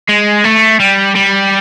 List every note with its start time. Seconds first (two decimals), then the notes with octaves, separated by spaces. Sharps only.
0.09 G#3
0.45 A3
0.80 G3
1.15 G3